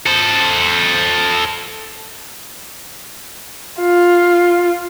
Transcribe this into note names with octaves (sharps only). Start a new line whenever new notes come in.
A4 C5
F4